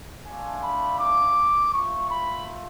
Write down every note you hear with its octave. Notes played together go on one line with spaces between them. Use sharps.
A3 D4 F4 G#5
B5
D6
A3 F4 C#6
B5